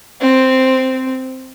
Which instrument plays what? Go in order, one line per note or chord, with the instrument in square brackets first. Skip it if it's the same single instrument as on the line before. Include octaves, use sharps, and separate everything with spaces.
[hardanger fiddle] C4